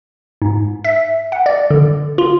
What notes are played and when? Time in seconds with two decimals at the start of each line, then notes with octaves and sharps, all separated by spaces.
0.42 G#2
0.84 E5
1.32 F#5
1.46 D5
1.71 D3
2.18 F4